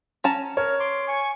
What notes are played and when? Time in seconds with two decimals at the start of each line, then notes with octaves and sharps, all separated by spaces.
0.24 C#4 A5 A#5
0.57 A#4 C#5
0.80 C6 D6
1.08 G#5 C#6